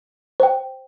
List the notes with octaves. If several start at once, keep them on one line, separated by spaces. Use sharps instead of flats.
C5 G5